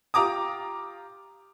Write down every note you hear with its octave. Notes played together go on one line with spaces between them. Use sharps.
F4 G4 A#5 D6 D#6